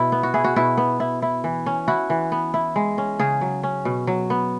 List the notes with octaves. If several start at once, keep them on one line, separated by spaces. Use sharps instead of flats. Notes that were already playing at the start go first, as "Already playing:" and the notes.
Already playing: B2 E4
B3
F#4
E4 G#4
F#4
B2 E4
B3
E4
E4
E3
C#4
E4 F#4
E3
B3
E4
G#3
C#4
C#3 G#4
F#3
C#4
B2
F#3
B3